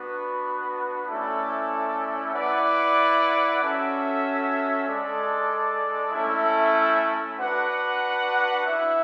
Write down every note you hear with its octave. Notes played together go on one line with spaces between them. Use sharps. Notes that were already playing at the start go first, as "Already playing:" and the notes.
Already playing: B3 D4 F#4 B4
A3 C#4 E4 A4 D5
E4 B4 D5 F#5
C#4 F#4 A4 E5
G#3 D4 A4 D5
A3 C#4 E4 A4 E5
D4 F#4 B4 F#5
E4 B4 E5